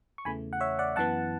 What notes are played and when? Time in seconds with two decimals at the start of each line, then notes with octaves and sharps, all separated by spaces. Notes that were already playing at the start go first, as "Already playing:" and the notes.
0.18 C#6
0.25 E2 C#3 E3 A3 G#5 B5
0.53 F#5
0.60 C#5 E5
0.79 D5 F#5
0.96 F#2 E3 B3 F#5 A5